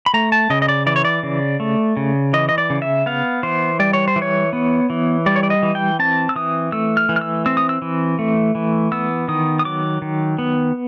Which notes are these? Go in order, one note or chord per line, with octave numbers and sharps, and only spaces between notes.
B5
A3 A#5
A5
C#3 D#5
D#5
D5
E3 D5
C#5
D5
C#3
A3
C#3
E3 D#5
D#5
D5
C#3
E5
B3 F5
E3 C5
G3 D5
C#5
C5
E3
C#5
B3
E3
G3 D5
C#5
D5
D#5
E3
G5
C4 A5
E6
E3 D#6
A3 E6
F6
E3
F6
E6
C4 E6
D#6
E6
E3
A3
E3
B3 E6
D#3 D#6
D#6
F#3 D6
D#3
B3